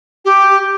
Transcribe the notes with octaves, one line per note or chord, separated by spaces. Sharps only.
G4